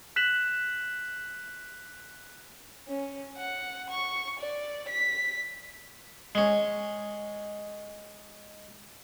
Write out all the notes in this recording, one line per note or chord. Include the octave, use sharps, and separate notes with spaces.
F#6 B6 E7 F#7
C#4
F#5
C#6
D5
B6
G#3 C#4